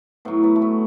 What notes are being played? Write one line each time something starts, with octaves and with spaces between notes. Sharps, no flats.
A2 F#3 B3
B3
A3
B3